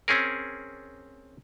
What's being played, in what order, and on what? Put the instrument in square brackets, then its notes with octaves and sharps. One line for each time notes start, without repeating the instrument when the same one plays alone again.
[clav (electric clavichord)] C4 C#4 G#4 A#4